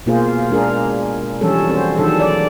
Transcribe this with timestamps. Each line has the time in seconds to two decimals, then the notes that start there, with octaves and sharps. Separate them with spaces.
0.06 B2 A#3 F4 G#4 C5
0.50 G#3 D4 G#4 A#4
1.41 E3 F3 G3 C#4 D4 A4
1.69 C4 C#4 F#4 C5
1.97 D#3 E3 F#3 D4 G#4 A4
2.20 D5